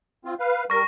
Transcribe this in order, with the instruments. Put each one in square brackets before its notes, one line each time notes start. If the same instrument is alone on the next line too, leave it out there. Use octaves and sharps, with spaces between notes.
[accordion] C4 F4
B4 F5
[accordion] G3 A#4 [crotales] C#6 A#6